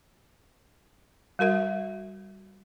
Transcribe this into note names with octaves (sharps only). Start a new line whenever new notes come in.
G3 F#4 A#4 E5